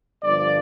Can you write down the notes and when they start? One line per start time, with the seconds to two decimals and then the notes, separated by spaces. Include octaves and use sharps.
0.23 G1 G2 F3 D5